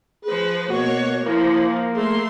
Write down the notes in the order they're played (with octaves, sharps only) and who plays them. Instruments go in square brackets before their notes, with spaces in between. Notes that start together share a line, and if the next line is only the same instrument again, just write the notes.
[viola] F3 B4 [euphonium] G#4
[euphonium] B2 [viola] A#3 C#5 [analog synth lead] F#4
[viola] F3 [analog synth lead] A#3 [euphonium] E4
[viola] A3 C6 [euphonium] G#4